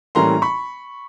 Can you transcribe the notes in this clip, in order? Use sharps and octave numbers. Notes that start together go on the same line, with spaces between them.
A2 E3 G3 A#3 C#4 A#5 C6
B5 C#6